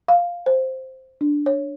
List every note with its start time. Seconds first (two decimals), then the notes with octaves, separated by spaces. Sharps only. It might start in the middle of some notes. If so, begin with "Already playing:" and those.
0.08 F5
0.46 C5
1.21 D4
1.46 C#5